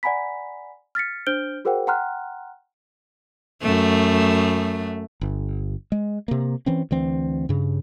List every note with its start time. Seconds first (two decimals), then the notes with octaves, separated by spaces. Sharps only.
0.03 D5 F#5 G#5 A#5 B5 B6
0.95 F6 A6 B6 C#7
1.27 D4 C5 F6 G6 D7 G7
1.65 F#4 G#4 A#4 C5 F#5 G5
1.87 F#5 G5 A#5 C6 F6 F#6
3.62 F#2 A3
5.21 G1
5.92 G#3
6.28 C3 A#3
6.66 E3 C4 C#4
6.91 D2 E3 C4
7.49 G2 C#3